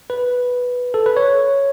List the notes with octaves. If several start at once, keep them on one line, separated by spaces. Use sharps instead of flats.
B4
A4
B4
C#5